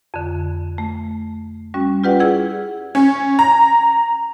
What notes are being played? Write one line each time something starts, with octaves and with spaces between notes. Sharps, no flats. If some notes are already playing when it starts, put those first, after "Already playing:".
F2 D3
A3
G3 C#4 F#4
F4 G4 B4 D5 F#5 G5
E4 G#4 D5 F#5
C#4
A#5